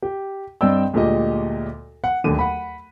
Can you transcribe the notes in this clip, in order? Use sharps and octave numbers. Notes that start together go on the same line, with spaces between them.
G4
G2 C4 D5 D#5 G5 E6
D2 A#2 G#3 G4 D#5
F#5
D1 D#2 D3 D#7
F#5 B5